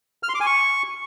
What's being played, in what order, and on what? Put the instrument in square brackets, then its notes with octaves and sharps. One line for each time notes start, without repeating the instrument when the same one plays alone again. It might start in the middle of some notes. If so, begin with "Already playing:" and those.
[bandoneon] F6
C6
D6
G#5
C#6